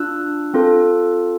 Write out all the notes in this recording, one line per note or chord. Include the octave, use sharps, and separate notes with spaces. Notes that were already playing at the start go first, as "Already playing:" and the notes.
Already playing: D4 F4 E6 F#6
C4 F4 A4